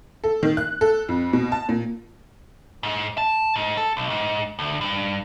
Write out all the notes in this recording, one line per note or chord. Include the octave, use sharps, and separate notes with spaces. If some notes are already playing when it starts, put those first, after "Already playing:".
A4
D#3
F#6
A4
F2
B2
A5
A#2
G#2
A5
G#2
A4
B1
G#2
D2
G2